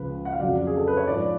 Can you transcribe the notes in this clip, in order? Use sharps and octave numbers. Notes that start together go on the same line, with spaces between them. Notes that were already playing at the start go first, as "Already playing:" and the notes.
Already playing: C#2 C#3 F3 B4
F#5
F5
F2 C#3 F#3 D5
G#4
A4
B4
C#5
G#2 F3 D5